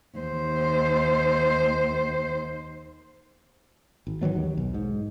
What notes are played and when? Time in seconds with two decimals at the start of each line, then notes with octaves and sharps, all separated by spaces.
0.18 D#2 C5
4.07 G#1
4.21 D#3 E3 F#3 A3
4.35 D#2
4.57 B1
4.74 G#2